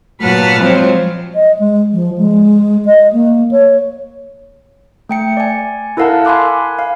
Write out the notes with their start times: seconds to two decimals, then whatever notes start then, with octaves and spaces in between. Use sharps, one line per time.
0.21 A#2 F#3 B4 F#5 A5 F6
0.60 F3 F#3 G#3 C4 C5 C#5
1.35 D#5
1.59 G#3
1.94 F3
2.18 G#3
2.85 D#5
3.13 A#3
3.51 C#5
5.09 A3 G5 C#7
5.37 D5 G#5
5.97 E4 A4 A#4 F5 F#5 A5
6.25 G#5 B5 C6 D6 F#6
6.79 F5